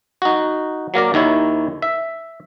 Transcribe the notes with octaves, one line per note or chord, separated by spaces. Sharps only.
D#4 F#4
F#3 A#3 A#4 D5
D#2 D#3 E4 C#5
E5